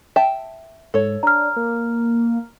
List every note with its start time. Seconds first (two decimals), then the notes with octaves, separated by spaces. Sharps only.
0.16 E5 G5 A5
0.94 G#2 A4 C#5
1.23 D4 A#5 F6
1.56 A#3